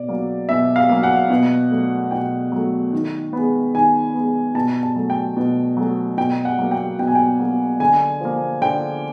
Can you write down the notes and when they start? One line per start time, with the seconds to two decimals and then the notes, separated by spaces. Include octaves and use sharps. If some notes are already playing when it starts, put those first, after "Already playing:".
Already playing: B2 D5
0.08 F#3 A#3
0.49 B2 E5
0.76 F5
0.89 F#3 A#3
1.03 F#5
1.30 B2
1.71 F#3 A3
2.11 B2 G5
2.52 F#3
2.57 A3
2.93 D#3
3.33 G#3 B3
3.75 D#3 G#5
4.14 G#3 B3
4.55 B2 A5
4.83 A5
4.96 F#3 A3
5.10 G5
5.37 B2
5.77 F#3 A3
6.18 B2 G5
6.45 F#5
6.59 F#3 A#3
6.71 G5
6.99 B2 G5
7.07 G#5
7.15 G5
7.40 F#3 A#3
7.80 D3 G#5
8.21 F3 A#3
8.61 D3 G5